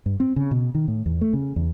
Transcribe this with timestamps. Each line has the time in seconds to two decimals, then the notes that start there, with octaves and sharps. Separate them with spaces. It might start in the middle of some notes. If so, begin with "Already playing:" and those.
0.06 G2
0.20 C4
0.36 C#3
0.51 B2
0.75 D#3
0.88 A2
1.06 E2
1.21 A3
1.33 C#3
1.56 E2